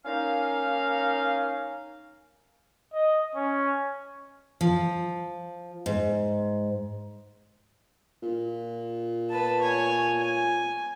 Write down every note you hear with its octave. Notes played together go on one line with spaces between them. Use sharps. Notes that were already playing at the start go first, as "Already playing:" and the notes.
A#3 C#4 D#4 F5
D#5
C#4
F3
G#2
A#2
B4 A5
C#5 G#5
G#5